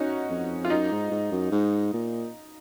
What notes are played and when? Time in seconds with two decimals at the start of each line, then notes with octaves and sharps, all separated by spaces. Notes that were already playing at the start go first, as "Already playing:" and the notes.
Already playing: C#4 D#4 F#4
0.30 F2
0.65 F4
0.70 F#2 D#4
0.91 G#2
1.11 G#2
1.31 F#2
1.52 G#2
1.93 A#2